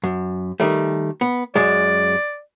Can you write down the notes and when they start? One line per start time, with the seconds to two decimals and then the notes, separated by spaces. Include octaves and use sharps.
0.04 F#2
0.60 D#3 G3 A3
1.21 B3
1.56 F#2 G#3 D5